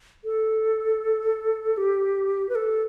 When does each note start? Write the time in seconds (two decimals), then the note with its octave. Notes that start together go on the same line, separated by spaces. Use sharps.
0.24 A4
1.77 G4
2.49 B4
2.55 A4